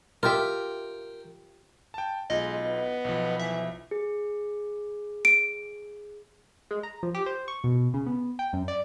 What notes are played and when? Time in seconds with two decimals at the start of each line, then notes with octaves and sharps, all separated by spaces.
0.23 F4 G4 A#4 E5 G5
1.94 G5 A5
2.30 B1 G#3 F4 D#5
2.66 B3
3.05 B1 F3
3.39 E3 E5
3.91 G#4
5.25 D7
6.71 G#3
6.83 A#5
7.03 F3
7.15 G4
7.26 C5
7.48 C#6
7.64 B2
7.94 C#3
8.06 B3
8.39 G5
8.53 F#2
8.68 D5